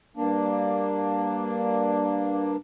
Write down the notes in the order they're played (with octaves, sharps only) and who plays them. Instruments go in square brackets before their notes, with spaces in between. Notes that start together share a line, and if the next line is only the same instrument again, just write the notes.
[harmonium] G2 A#3 D4